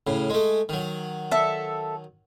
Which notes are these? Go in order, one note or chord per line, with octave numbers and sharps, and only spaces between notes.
A2 C#3
G#3 A3
D#3 F#3
A4 E5